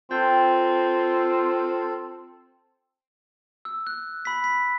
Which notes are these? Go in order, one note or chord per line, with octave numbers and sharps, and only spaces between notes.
C4 F4 A4 G5
E6
F#6
B5 B6
B6